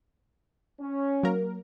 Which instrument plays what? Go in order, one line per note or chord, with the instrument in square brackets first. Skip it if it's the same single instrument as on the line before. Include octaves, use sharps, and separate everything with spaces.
[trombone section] C#4
[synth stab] F#3 A#3 A#4